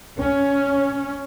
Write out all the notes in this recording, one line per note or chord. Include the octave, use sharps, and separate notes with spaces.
C#4